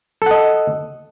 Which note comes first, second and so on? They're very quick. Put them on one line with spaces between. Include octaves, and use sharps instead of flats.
A4 F#5 D#5